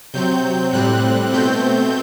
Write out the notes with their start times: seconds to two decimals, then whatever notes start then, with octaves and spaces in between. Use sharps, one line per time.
0.14 C3 F#3 C4 G6
0.73 A2 G3 C4 F#6
1.33 B2 A3 C4 G6